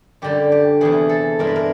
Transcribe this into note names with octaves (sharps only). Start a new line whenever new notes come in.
F#2 D3 G3 G4
G4
E2 C3 E3 G#4
A4
G2 E3 G#3 A#4
B4
A#4